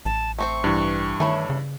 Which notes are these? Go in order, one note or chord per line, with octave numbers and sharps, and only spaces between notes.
A1 A5
A3 C4 C5 C#6
G2 E3
D#3 A3 E4 C#5
C#3